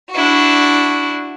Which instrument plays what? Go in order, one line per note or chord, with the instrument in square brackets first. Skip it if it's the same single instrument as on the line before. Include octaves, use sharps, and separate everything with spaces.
[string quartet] D4 E4 F#4